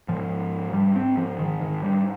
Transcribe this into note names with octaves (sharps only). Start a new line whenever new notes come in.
G#2 F3
G3
C4
F3
D#3
D#3
G3